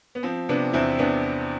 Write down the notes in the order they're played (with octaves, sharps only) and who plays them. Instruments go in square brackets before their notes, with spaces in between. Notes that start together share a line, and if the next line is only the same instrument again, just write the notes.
[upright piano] B3
F3 C4
C3 B3 D4
E2 C4 E4
E2 B3 D4